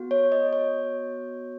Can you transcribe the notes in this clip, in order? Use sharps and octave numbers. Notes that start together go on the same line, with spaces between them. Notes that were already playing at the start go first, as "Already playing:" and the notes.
Already playing: B3 F#4
C#5
D#5
C#5